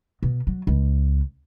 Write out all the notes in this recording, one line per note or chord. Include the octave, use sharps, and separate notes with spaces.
B2
F#3
C#2